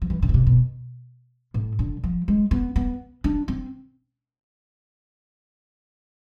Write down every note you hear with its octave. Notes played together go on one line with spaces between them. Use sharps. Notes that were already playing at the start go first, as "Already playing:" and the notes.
F3
E3
D3
B2
C3
B2
A2
D3
F3
G#3
B3
B3
D4
C4